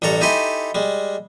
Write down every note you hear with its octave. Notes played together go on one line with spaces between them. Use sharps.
A1 G3 A4 A#5 C#6
D#4 E4 G4 A4 G#5 C6
G3 G#3